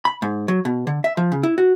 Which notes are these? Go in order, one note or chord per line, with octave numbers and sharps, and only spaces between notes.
B5
G#2
F#3
B2
D3
E5
F3
C#3
E4
F#4